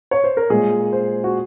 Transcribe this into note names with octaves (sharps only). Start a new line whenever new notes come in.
C#5
C5
A#4
A#2 G#3 G#4
C5
F#4